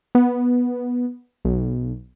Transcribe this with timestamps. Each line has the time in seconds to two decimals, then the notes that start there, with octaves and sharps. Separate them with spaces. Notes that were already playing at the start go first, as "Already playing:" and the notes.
0.15 B3
1.45 B1